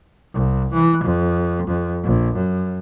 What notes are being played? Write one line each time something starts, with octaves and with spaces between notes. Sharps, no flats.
C2
E3
F2
F2
A#1
F#2